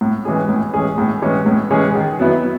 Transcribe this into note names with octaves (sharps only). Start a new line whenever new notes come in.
A2
E3 G#3 C#4 G#4
A2
E3 G#3 C#4 G#4
A2
E3 G#3 C#4 G#4
A2
E3 G#3 C#4 G#4
D#3
F#3 B3 E4